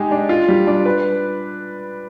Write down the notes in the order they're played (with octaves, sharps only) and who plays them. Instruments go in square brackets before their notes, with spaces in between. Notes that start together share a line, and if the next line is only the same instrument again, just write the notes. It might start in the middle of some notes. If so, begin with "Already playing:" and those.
Already playing: [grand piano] G#3 D#4 G4
D4
F4
G3
D4
B4